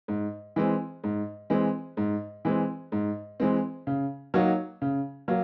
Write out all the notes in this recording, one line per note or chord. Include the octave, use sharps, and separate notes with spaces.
G#2
E3 G#3 C4
G#2
E3 G#3 C4
G#2
E3 G#3 C4
G#2
E3 G#3 C4
C#3
F#3 A#3 D#4 F#4
C#3
F#3 A#3